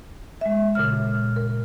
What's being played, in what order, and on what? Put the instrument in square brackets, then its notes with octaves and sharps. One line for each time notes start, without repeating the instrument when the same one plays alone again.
[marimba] G#3 E5
A#2 C#3 F6
A#4